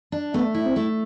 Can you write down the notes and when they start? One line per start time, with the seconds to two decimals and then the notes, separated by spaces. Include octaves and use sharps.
0.12 D4
0.34 A3 B3
0.55 E4
0.65 C4
0.76 A3